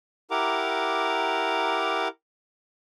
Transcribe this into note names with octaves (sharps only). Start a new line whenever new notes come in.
E4 G4 A#4 F#5 A#5 D6